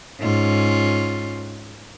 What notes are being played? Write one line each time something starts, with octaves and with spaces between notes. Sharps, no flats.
G#2 C#4 F4